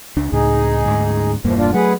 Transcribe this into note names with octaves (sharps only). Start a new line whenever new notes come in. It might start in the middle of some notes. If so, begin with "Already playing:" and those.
C#2 D4
C#2 A2 D#4 G#4
D2 G#2
E1 G2 E3 F3 A#3
D4 F4
F#3 A3 G#4 B4 F#5